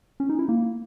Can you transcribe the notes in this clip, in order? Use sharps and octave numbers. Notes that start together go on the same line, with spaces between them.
C#4
D#4
E4
A#3